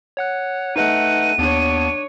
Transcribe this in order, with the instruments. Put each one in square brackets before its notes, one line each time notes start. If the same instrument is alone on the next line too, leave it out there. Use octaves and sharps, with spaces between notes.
[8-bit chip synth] C#5 F#5 F#6
[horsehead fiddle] A3 F#5 [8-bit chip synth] D#4 B4 D#5 [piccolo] D#7
[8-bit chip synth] D#2 B3 A5 [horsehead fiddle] D4 C#5